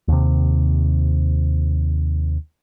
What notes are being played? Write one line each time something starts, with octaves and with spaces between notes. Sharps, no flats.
D#2 C3